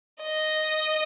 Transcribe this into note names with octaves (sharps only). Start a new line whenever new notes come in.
D#5